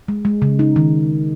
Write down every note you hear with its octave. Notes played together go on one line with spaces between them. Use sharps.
G#3
G#3
C#3
D#4
D#3